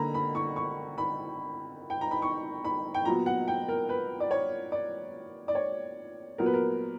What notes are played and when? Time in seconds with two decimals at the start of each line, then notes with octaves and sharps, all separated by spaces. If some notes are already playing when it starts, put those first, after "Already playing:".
Already playing: D3 A#3 A#5 B5
0.14 B5
0.35 C#6
0.56 C#6
0.98 B5
1.90 G5
2.01 A#5
2.11 B5
2.22 C#6
2.65 B5
2.94 G5
3.05 A#2 F#3 B3 A#5
3.26 F#5
3.48 G5
3.68 A#4
3.89 B4
4.20 D5
4.31 C#5
4.72 D5
5.48 D5
5.55 C#5
6.38 A#2 F#3 B3 A#4
6.46 B4
6.54 A#4